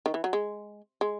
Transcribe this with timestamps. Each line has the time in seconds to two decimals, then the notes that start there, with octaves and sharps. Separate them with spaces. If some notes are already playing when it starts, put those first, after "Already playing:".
0.06 D#3
0.14 E3
0.24 F#3
0.33 G#3
1.01 G#3